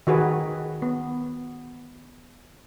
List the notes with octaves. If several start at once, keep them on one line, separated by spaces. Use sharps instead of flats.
D#3 F#4 G#4 B4
B3